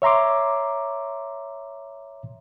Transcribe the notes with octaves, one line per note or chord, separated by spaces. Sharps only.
C#5 E5 A#5 C6 D6